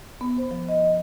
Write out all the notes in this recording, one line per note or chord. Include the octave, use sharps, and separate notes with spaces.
B3
C5
F3
D#5